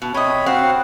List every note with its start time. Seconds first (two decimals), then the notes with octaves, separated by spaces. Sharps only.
0.02 B2
0.14 C3 C#5 D#5 B5
0.46 C4 F#4 F5 F#5